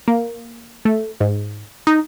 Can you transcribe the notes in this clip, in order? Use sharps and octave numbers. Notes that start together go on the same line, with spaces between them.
A#3
A3
G#2
D#4